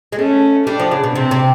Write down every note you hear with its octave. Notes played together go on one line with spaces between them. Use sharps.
G#3
A3 C#4
G3 D4
F3
C#3
B2
C3 C4
C3